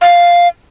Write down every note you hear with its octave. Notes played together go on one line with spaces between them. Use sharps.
F5